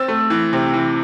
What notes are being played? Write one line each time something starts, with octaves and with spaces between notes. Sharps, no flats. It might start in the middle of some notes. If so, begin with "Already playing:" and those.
Already playing: C4 E6 A6
A3
E3
C3
E3